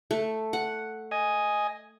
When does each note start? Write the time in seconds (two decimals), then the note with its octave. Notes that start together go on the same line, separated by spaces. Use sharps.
0.11 A3
0.53 F#5
1.11 D#5 G#5